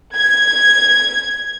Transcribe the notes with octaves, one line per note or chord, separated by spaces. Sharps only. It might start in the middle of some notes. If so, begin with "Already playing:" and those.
G#6